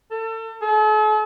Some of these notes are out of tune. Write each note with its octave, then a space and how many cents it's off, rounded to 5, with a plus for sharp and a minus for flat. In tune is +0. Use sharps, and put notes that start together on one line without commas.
A4 +35
A4 -45